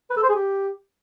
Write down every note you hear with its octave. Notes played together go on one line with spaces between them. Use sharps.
B4
A4
C5
G#4
G4